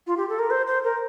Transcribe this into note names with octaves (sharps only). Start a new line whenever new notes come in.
F4
G4
A4
A#4
C5
C5
A#4